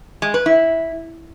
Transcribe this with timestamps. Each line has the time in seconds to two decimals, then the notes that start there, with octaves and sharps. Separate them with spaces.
0.22 G#3
0.34 B4
0.46 E4